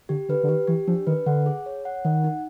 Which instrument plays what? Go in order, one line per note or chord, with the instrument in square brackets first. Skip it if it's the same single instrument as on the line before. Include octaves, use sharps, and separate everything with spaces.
[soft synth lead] D3 [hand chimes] G4
[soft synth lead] D3 [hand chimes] B4
[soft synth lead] D3
[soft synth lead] D#3 [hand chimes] G4
[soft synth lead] E3 [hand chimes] G4
[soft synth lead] F3 [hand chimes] D4
[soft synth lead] D#3 [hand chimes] B4
[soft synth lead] D3 [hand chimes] F#5
[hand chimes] G#4
C#5
F#5
[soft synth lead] D#3 [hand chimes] F#5
[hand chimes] D#4